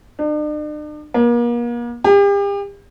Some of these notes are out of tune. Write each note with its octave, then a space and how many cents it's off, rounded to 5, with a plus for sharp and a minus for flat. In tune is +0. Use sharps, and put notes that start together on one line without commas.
D4 +45
A#3 +40
G4 +40